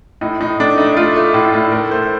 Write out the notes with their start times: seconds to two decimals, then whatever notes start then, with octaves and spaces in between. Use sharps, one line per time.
0.21 A2 D#4
0.40 A2 D#4
0.60 A3 D4
0.78 A3 D#4
0.97 A3 F4
1.16 A3
1.34 A2
1.54 A2
1.72 A3 A#4
1.91 A3 C5